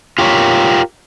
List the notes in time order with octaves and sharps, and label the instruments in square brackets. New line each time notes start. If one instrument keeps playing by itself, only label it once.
[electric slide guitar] F4 G4 A#4 C#5